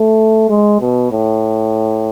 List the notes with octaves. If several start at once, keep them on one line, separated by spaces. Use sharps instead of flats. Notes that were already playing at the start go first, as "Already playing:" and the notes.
Already playing: A3
G#3
B2
A2